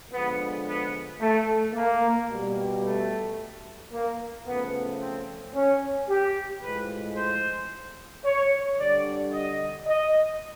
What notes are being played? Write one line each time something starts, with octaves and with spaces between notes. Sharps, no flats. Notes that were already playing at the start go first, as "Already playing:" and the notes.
D3 F3 G#3 B3
B3
A3
A#3
B2 G3
A3
A#3
C#3 F3 A3 B3
C4
C#4
G4
A2 F3 G#3 B4
C5
C#5
D3 G3 D5
D#5
D#5